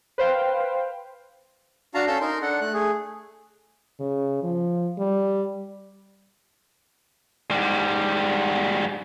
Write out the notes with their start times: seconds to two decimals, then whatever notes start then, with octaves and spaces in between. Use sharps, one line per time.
0.18 B4 C5 F5 G5
1.94 D4 F#4 F5 A5 A#5
2.07 C#4 A4 F5 A5 E6 G6
2.21 D#4 A#4 C6
2.42 D4 A4 F#5
2.61 A3 F#6
2.73 A3 G#4
4.00 C#3
4.43 F3
4.99 G3
7.51 G#2 G3